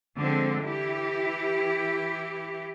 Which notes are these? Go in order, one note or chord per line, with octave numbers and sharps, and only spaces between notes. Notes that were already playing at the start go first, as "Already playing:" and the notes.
D3 F3 G#3 C4
E3 E4 G4